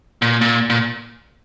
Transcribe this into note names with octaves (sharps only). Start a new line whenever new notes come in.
A#2
A#2
A#2